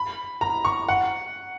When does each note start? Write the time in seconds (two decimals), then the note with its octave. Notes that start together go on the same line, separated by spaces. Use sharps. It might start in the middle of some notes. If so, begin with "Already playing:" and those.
Already playing: B5
0.41 A#5
0.65 C#6
0.88 F#5